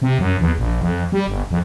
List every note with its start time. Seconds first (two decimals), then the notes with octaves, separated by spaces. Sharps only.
0.02 C3
0.19 F#2
0.40 E2
0.58 A#1
0.81 F2
1.12 G3
1.28 G1
1.51 F2